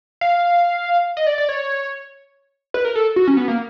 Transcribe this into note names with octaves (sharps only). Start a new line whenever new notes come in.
F5
D#5
D5
D5
C#5
B4
A#4
A4
F#4
C#4
B3
A#3